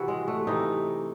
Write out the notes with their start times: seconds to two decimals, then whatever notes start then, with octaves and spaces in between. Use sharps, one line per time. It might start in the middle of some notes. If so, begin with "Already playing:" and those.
Already playing: C3 E3 E4 F#4
0.08 G#3
0.28 A3
0.47 C3 E3 D#4